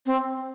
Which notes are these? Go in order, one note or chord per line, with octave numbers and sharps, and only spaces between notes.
C4